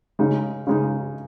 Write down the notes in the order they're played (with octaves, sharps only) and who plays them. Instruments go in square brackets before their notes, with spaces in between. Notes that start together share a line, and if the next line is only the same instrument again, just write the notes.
[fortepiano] C#3 G#3 D#4
C#3 G#3 D#4